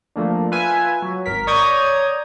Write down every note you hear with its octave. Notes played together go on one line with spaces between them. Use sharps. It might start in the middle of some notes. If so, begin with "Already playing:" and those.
F3 A3 A#3 D4
F4 B4 E5 G#5
F#3
G#1 A#4 B6
C#5 D5 A#5 D#6 G6 G#6